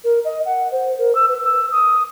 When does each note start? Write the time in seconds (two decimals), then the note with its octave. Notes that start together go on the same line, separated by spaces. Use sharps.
0.04 A#4
0.25 D#5
0.45 F#5
0.71 C5
0.99 A#4
1.15 E6
1.29 B4
1.44 E6
1.72 D#6